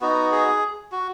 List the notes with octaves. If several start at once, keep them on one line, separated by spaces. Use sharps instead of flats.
B3 D#4 F#4
G#4
F#4